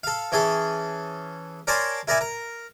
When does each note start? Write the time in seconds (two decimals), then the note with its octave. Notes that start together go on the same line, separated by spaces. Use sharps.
0.04 A4 F5
0.32 E3 C#4 G#4 A4
1.67 A#4 C#5 D5 G#5 A5 C6
2.08 E4 A#4 D5 E5 G#5
2.21 A#4